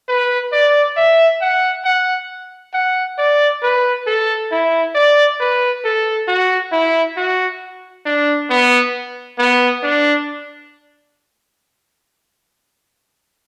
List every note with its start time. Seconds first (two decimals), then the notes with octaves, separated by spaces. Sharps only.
0.08 B4
0.52 D5
0.97 E5
1.41 F#5
1.85 F#5
2.74 F#5
3.18 D5
3.63 B4
4.07 A4
4.51 E4
4.95 D5
5.40 B4
5.85 A4
6.28 F#4
6.72 E4
7.17 F#4
8.06 D4
8.50 B3
9.38 B3
9.83 D4